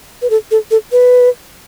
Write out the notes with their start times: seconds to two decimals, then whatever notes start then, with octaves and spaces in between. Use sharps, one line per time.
0.22 B4
0.30 A4
0.51 A4
0.71 A4
0.92 B4